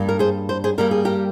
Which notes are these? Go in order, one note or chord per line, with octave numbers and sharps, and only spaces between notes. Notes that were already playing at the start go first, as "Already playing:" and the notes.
Already playing: G2 G3 A#3
A#4
G#4 C5
C5
G#4 C5
G2 G3 A#3 A#4
G#4
G4 A#4